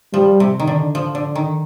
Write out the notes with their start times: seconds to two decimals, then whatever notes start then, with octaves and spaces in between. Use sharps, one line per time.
0.14 F3 G3
0.40 C3
0.60 D#3
0.67 D3
0.95 F3
1.15 D3
1.35 D#3